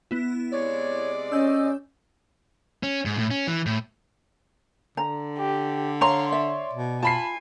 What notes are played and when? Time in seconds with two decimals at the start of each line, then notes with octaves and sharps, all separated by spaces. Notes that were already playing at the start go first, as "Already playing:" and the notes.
0.11 B3 E4
0.51 C3 G#3 C#5 D5
1.32 C#4 D#5 E6 G6
2.83 C#4
3.05 G#2
3.18 A2
3.31 C#4
3.47 E3
3.66 A2
4.97 D3 A#5
5.37 G4
6.01 C#5 F5 A#5 C6
6.32 D5 E5
6.73 B2
7.03 F4 G#5 A5 B5 C7